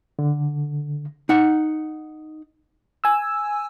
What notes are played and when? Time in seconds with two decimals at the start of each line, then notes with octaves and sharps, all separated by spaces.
0.19 D3
1.29 D#4 F#5
3.04 G#5 E6